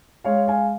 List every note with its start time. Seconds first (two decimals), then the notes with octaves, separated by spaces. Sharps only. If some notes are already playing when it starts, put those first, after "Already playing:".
0.24 G#3 C#5 F5
0.48 F5 G#5